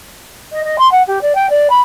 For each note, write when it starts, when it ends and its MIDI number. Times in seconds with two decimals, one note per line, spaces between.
0.52 0.63 75
0.64 0.76 75
0.79 0.90 84
0.92 1.03 78
1.07 1.19 67
1.22 1.35 74
1.35 1.47 79
1.50 1.68 74
1.70 1.82 83